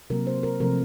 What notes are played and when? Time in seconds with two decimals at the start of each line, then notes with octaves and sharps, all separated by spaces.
0.10 C3 F#3 A#3 A#4
0.27 C5
0.43 A#4
0.60 C3 F3 A3 A#4